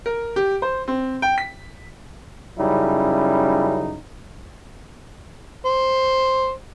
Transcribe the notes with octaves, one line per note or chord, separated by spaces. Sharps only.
A#4
G4
C5
C4
G5
B6
F#2 C#3 G3 D#4 E4
C5